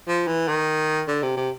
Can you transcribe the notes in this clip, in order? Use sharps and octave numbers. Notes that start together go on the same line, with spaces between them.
F3
E3
D#3
D3
C3
C3